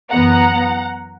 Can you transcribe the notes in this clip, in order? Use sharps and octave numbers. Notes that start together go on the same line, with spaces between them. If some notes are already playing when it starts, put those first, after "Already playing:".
F#2 E3 B3 F#5 A#5